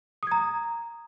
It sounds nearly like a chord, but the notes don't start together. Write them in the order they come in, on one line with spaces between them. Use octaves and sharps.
D#6 G#6 A#5